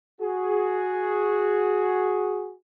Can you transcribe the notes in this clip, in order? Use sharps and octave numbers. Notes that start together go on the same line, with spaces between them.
F#4 G#4